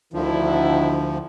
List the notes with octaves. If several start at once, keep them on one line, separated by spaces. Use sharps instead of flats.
D2 D3 D#3 F3 E4